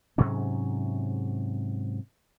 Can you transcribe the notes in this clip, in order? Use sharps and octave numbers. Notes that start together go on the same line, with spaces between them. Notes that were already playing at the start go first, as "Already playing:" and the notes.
G#2 C3 F#3 C#4